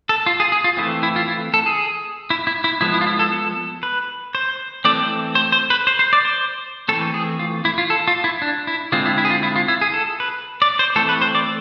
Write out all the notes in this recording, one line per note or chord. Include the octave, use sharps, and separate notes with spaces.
A4
F4
G#4
G#4
F4
E3 A3 C4 E4
E4
F4
E4
A4
G#4
E4
E4
E4
F3 G#3 B3 E4
E4
F4
E4
A4
A4
B4
C5
E3 A3 C4 D5
C5
C5
C5
B4
C5
C5
D5
C5
E3 A3 C4 A4
G#4
F4
E4
F4
A4
F4
E4
D4
E4
D3 G#3 C4 F4
E4
E4
G#4
F4
E4
F4
E4
G#4
A4
B4
D5
C5
E3 A3 C4 A4
B4
C5
D5